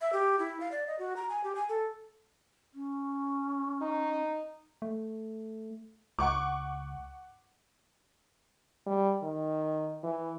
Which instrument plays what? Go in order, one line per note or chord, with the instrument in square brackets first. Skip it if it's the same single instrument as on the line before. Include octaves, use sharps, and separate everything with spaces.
[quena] E5
G4
E4
F5
D5
D#5
F#4
A#5
G#5
G4
G#5
A4
[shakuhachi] C#4
[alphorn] D#4
[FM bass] A3
[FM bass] C#2 [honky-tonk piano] F#5 C#6 D6
[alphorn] G3
D#3
E3